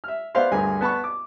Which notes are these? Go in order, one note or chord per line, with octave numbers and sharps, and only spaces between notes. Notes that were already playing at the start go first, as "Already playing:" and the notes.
E5 F6
B3 C5 D5 E5 F5 C6
D2 G2 G#4 A#4 G#5
B3 A5 B5 C#6
D6